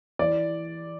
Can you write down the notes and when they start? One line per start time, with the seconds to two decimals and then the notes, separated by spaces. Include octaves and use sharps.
0.19 E3 D5